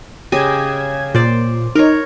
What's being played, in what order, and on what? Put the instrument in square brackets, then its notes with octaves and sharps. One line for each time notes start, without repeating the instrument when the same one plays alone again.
[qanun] C#3 G4 D#5 [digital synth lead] G#6
[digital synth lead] A#2 [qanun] C5 D5
[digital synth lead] D#4 [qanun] A#4 C#5